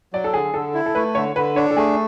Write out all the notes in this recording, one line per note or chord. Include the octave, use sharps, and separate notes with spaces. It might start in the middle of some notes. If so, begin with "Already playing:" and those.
F#3 D5
A4
D3 G#4
D3 A4
E4
A4
A3 B4
D3 C#5
D3 B4
D4 C#5
A4
A3 G#4